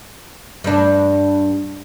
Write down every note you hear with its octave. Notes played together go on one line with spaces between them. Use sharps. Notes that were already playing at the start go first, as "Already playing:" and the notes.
G2 D4